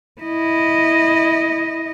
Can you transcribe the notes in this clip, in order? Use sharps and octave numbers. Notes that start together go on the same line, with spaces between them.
E4 D#5